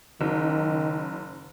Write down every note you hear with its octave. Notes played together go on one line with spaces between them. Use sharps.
F#1 D#3